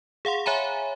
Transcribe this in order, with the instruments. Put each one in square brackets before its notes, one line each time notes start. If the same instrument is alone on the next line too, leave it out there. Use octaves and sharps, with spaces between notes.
[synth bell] G#4 F5 F#5 C6
C#5 E5 G#5 A#5 B5